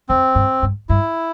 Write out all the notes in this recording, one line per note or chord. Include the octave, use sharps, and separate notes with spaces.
F2 C4
G2
G2
G2 E4